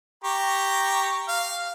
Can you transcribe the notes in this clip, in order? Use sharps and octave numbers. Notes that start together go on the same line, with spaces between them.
G4 A#5 C#6
F5